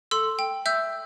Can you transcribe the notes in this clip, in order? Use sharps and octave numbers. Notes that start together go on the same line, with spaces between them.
A4 C6 E6
G5
E5 E6 G6